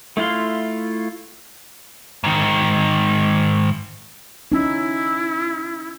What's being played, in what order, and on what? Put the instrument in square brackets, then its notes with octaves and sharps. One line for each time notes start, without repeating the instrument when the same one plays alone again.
[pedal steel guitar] A3 E4 F4 F5 C6
[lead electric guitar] G#2 D#3
[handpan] C#4 D#4 [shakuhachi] E4